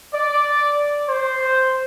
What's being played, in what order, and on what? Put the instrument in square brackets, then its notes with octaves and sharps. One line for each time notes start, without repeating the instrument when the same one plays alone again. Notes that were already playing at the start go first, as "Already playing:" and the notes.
[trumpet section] D5
C5